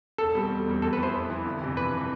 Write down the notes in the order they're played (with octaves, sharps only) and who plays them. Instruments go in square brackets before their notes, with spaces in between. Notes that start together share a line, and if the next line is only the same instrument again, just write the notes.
[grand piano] E1 [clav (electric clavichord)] A4
[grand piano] E2 B2 G3 C4
E1
E2 B2 G3 C4
[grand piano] F2 [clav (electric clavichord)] A4
[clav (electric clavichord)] B4
[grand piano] E3 B3 E4 [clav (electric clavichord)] C5
[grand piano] F2
E3 B3 E4
G1
F2 C3 E3
[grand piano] G1 [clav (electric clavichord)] B4
[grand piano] C3 E3